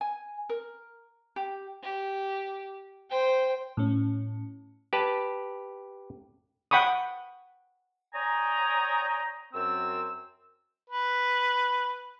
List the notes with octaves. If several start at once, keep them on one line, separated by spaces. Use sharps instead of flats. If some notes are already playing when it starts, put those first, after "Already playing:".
G#5
A#4
G4
G4
C5 G5
A2 C#4
G4 B4 A5
F#5 G5 B5 C#6 D#6
C#5 D5 G5 G#5 A#5 D#6
F#2 C4 E6
B4